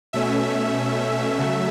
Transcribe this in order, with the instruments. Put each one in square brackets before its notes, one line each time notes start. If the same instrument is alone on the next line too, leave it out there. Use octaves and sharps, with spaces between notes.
[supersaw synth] B2 A3 C#4 E5
C#3 F#3 A3